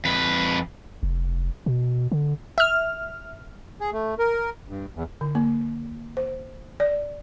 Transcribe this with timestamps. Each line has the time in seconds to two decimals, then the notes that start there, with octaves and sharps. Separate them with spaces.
0.05 F2 B4
1.03 F1
1.66 B2
2.12 D3
2.58 E5 F6
3.80 G#4
3.92 A3
4.19 A#4
4.68 G2
4.95 E2
5.21 D3
5.35 A#3
6.17 C5
6.80 D5